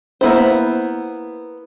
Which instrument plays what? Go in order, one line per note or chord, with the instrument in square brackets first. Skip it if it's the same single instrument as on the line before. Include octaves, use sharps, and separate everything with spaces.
[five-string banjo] A#3 B3 E4 C5